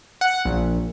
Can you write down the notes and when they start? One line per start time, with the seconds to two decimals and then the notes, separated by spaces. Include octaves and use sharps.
0.21 F#5
0.45 A#1